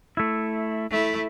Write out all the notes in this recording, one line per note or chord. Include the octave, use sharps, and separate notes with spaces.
A3 E4
A3 E4